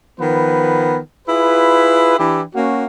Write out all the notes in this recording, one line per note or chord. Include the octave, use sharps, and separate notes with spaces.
D#3 F3 B3 B4
E4 F4 G#4 B4
E3 D4 E4 G4
A#3 C#4 F#4